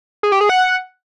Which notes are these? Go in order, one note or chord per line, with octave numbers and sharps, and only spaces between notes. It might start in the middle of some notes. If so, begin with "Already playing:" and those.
G#4
G4
G#4
F#5